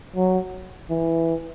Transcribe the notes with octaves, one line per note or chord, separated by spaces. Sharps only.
F#3
E3